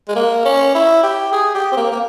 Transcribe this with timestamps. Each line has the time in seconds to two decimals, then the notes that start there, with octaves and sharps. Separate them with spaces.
0.08 G#3
0.16 A#3
0.45 C#4
0.75 E4
1.03 G4
1.32 G#4
1.54 G4
1.72 C4
1.77 A#3
1.92 A#3